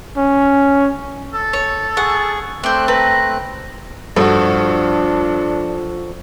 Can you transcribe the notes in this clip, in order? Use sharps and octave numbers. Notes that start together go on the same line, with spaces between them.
C#4
A4
C#5
G#4 F#5 C#6
A3 C4 C5 D5 F#6
B4 A#5
G2 F3 D4 F#4 A4